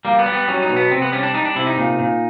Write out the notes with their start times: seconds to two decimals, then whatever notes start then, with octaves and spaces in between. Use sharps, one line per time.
0.05 G3 A#3
0.19 B3
0.26 G3
0.34 B3
0.48 F#3 C#4
0.62 D#4
0.69 B2
0.76 B3
0.91 C3 C4
1.02 B3
1.12 G3 C#4
1.23 D4
1.34 G3 D#4
1.45 D4
1.56 C3 E4
1.67 D#4
1.77 A#2
1.99 A#2